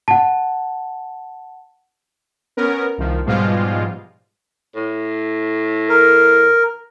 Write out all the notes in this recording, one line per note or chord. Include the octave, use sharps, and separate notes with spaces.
F#5 A5
B3 C#4 A#4
C2 D#3 F3
G#2 B2 F3 G3 G#3 F4
A2
A#4